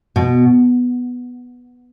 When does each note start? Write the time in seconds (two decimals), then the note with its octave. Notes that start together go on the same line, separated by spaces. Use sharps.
0.16 B2